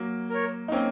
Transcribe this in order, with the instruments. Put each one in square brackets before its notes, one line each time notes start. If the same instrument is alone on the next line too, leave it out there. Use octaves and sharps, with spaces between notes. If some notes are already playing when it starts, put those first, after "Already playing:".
Already playing: [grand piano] F#3 A#3
[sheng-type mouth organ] A#4 C#5
[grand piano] D#4
[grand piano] A#3 C#4 [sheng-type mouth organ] C4